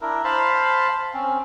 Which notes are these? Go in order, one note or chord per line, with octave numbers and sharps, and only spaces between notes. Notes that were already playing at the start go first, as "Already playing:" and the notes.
D4 E4 A#4
C5 F5 A5 B5
C4 C#4